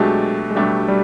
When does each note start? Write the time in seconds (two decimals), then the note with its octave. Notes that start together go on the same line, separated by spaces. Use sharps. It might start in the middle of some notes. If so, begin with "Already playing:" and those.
Already playing: B2 F#3 G#3 A3 D4 G4
0.51 G#3
0.55 B2 F#3 G3 A3 D4 G4
0.88 G3